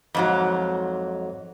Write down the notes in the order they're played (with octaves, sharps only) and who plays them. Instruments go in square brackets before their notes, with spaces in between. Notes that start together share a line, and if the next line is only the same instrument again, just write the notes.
[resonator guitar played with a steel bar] F2 G#2 F#3